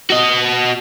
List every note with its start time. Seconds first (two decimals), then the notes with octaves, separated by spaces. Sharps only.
0.10 F#4 D#5